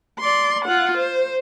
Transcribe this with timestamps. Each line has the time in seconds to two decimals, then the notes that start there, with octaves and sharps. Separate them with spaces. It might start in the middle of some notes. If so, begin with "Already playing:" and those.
0.20 D5 C6
0.64 F4 F#5
0.97 C5